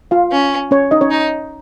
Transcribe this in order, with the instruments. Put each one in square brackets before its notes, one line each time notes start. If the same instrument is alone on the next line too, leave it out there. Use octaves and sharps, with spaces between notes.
[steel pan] F4 F5
[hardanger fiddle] C#4
[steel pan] C#4 C#5
D#4 D#5
C#4 C#5
[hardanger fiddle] D#4